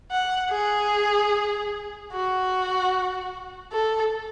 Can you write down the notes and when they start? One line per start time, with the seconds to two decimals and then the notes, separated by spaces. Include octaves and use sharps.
0.12 F#5
0.52 G#4
2.12 F#4
3.73 A4